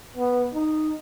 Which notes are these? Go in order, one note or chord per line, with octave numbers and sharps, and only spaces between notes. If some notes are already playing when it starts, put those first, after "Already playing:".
B3
D#4